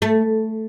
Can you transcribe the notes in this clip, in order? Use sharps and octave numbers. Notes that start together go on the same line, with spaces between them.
A3